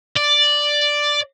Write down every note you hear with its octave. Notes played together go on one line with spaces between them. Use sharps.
D5